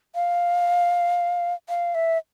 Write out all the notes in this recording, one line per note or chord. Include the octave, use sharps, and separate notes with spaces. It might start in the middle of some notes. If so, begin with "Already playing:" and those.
F5
F5
E5